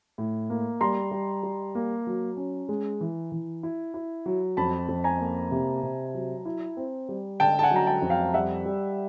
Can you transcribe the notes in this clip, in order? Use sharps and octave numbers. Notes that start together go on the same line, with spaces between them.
A2
A#3
G3 A#5 C6
G3
G3
A#3
F#3
C#4
G#3
E3
E3
E4
E4
F#3
F2 A5 B5
F2
G#5 A#5
A#3
C3
C3
F#3
E4
C4
G3
D3 G5 A5
A5
F#5 G#5
F#3 A#5
G5 A5
F2
F5 G5
G3 E5 F#5
G3